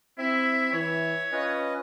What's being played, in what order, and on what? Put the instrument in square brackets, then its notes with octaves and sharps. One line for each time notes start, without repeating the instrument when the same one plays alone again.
[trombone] C4 [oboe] E4 [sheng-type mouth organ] E5
[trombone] E3 [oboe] C#5
[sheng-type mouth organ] C#4 B4 D#5 [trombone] F4